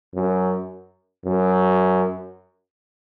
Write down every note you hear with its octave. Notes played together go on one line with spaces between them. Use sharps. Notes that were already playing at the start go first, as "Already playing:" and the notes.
F#2
F#2